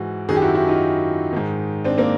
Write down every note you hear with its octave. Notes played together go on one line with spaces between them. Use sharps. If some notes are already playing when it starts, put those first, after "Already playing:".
Already playing: G#2 E3 F#4
F#2 D#3 F#4 G#4
G4
E4 F#4
E4 F#4
D#4 F4
G#2 D#3
C4 D4
A#3 C4